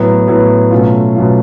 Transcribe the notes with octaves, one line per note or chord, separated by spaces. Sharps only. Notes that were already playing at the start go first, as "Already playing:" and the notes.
Already playing: A2 F#3 B3
A2 F#3 B3
B2 F#3 A3 C#4 F4
B2 F#3 A3 C#4 F4